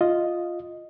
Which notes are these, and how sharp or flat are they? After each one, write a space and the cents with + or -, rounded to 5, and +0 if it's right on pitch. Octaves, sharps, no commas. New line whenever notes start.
F4 +0 D#5 +0